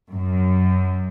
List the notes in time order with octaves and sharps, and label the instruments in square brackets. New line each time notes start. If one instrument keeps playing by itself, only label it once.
[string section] F#2